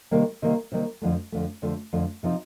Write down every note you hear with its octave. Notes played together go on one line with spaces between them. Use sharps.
C3 D#3 G3 A#3
C3 D#3 G3 A#3
C3 D#3 G3 A#3
F2 D3 F3 A3
F2 D3 F3 A3
F2 D3 F3 A3
F2 D3 F3 A3
C3 F3 C4 D#4